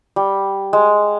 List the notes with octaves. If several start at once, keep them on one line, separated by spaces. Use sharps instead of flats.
G3
G#3